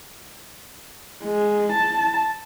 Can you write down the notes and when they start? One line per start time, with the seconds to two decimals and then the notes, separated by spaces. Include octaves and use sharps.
1.24 G#3
1.72 A5